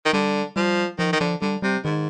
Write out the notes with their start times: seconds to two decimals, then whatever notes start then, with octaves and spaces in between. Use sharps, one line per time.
0.06 D#3
0.13 D3 G3
0.56 F3 G3
0.99 D#3 F3
1.13 D#3
1.20 D3 F3
1.41 D3 G3
1.62 C3 G3
1.84 G#2 D#3